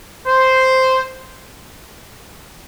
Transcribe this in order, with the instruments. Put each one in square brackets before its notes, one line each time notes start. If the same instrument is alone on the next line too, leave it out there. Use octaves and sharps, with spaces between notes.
[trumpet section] C5